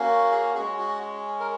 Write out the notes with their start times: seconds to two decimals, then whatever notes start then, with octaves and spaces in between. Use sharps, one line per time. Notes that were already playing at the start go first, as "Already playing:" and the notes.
Already playing: A#3 C#4 F#4
0.31 G#4
0.54 G#3 C#4 F#4 G#4
0.78 F#4
1.40 A#4